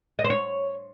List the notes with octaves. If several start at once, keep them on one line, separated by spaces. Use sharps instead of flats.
D#5
C5
C#5